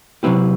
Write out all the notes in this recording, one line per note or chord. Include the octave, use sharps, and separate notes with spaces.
C3 F#3 A3 C4 E4 G4 B4